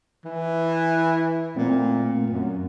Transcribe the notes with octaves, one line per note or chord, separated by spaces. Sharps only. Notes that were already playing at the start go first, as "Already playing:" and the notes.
E3
A#2 A3 C4
F#2